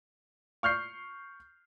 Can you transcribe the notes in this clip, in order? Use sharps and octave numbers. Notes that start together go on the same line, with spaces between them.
C#6 F6 G6 C7